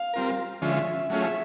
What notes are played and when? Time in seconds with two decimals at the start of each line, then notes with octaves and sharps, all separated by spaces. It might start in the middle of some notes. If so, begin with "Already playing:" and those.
Already playing: F5
0.14 G3 C4 F4 A#4
0.62 D3 F3 G#3 C#4 F4 E5
1.10 F#3 A3 C#4 F4 G#4 E5